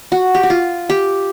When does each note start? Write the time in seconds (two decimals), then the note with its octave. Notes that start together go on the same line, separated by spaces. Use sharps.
0.12 F#4
0.35 G4
0.43 F#4
0.50 F4
0.90 G4